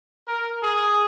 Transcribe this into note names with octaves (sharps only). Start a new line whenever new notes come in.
A#4
G#4